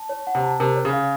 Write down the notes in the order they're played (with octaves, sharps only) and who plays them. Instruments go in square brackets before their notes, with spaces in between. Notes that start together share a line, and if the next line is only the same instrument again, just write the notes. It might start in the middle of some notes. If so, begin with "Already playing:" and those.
Already playing: [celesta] A5
C#5
F#5
[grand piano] C3
[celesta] A5
[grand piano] C3 [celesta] A#4
[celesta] C#5
[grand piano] C#3
[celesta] F5